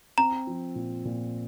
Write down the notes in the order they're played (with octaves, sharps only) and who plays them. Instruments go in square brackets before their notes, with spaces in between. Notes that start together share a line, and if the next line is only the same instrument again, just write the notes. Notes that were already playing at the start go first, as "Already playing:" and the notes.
[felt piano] C4 [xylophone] A#5
[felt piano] F3
A#2
A#2